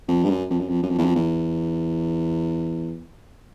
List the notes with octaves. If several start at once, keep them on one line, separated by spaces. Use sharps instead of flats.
F2
G2
F#2
F2
F#2
F2
F#2
F2
E2
F2
E2